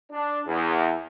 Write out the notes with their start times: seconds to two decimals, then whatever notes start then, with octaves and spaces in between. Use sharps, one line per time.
0.12 D4
0.46 E2